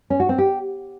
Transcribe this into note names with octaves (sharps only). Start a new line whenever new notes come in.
C#4
F#4
C4
G4